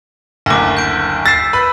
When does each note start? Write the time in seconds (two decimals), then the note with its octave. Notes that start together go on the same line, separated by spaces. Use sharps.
0.46 F#1 D2 D6 A#6
0.77 G6 D7
1.26 E6 A6 B6 C7 E7
1.53 B4 B5